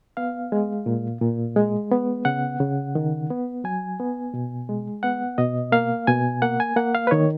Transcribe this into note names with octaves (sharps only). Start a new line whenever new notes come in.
B3 F5
G#3
A#2
A#2
G#3
B3
C#3 F#5
C#3
D#3
B3
F#3 G#5
B3
B2
G#3
B3 F#5
B2 D#5
A#3 F5
B2 G#5
A#3 F#5
G#5
A#3 F#5
F5
B4
D#3 C#5